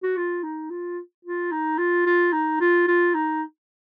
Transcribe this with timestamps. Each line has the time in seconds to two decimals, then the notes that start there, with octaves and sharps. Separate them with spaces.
0.03 F#4
0.17 F4
0.43 D#4
0.70 F4
1.25 F4
1.52 D#4
1.78 F4
2.06 F4
2.33 D#4
2.60 F4
2.87 F4
3.14 D#4